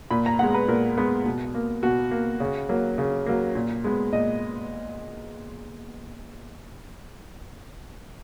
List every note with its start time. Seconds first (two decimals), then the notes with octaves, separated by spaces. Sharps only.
0.11 A#2 B5
0.26 A#5
0.39 G#3 B3 F#5
0.54 B4
0.68 A#2 A#4
0.98 G#3 B3
1.26 B2
1.55 A#3
1.83 B2 F#4
2.11 A#3
2.40 C#3
2.69 F#3 A#3
2.98 C#3
3.26 F#3 A#3
3.55 A#2
3.84 G#3 B3
4.13 A#2 D#5